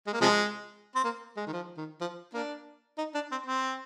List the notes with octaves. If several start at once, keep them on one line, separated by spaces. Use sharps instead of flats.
G#3
A#3
C3 F3 G#3
C4
A#3
G#3
D#3
F3
D#3
F3
A#3 D4
D#4
D4
C4
C4